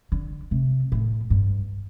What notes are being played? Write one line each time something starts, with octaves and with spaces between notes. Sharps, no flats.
D3
C3
A2
G2